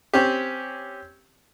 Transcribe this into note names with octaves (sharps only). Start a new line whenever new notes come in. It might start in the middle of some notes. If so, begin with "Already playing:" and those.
C4 C#4 G4